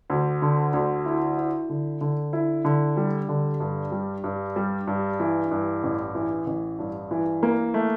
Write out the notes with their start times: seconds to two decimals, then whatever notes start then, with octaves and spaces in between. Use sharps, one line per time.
0.10 D2
0.42 D3
0.73 D2
1.06 E4
1.37 E4
1.69 D3
2.01 D3
2.33 E4
2.65 D3
2.97 G3
3.29 D3
3.60 G2
3.92 G3
4.24 G2
4.56 G3
4.87 G2
5.20 E3
5.51 G2
5.83 A1
6.15 E3
6.46 A1
6.79 G2
7.11 E3
7.43 A#3
7.74 A3